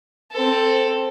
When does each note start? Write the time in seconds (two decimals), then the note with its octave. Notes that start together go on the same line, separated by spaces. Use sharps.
0.32 C4 A4